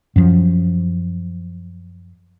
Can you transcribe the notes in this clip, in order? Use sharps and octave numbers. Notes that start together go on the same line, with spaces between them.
F#2 F3